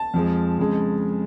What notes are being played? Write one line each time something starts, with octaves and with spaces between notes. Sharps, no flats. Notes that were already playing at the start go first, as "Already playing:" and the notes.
Already playing: A5
F2 F3 G#3
F2 C#3 G#3